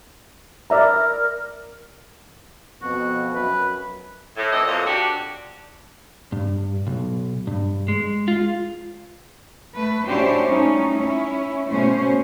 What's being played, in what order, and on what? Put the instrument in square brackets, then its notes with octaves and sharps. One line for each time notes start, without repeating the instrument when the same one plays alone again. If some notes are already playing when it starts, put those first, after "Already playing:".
[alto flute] A#4 [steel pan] D5 E5 A#5
[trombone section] F2 B2 [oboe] F#4
[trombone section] F#2 [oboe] B4
[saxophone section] A2
F2 E3 A4 D#5
F2 A#2 F#3 A#3
D4 F#4 G4
[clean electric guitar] G2
B1
G2
G#3
F4
[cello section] A3 B4
C#4 D4 E4 F#4 G4 C5
G3 A3 C#4 D#4
C#4 E4
B2 A3 C#4 C5